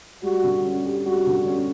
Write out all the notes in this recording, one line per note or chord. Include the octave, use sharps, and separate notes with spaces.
G3 F#4
D3
C#4
G4
G3 F#4
D3
C#4